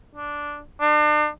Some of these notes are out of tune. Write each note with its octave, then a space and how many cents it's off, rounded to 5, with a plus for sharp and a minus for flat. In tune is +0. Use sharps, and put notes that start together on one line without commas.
D4 -5
D4 +40